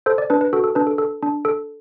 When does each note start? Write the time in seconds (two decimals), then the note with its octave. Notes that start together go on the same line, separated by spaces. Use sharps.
0.06 A4 C5
0.18 D5
0.30 D4 B4
0.41 B4
0.53 F#4 A4
0.64 A4
0.75 D4 B4
0.87 A4
0.98 A4
1.23 D4
1.45 A4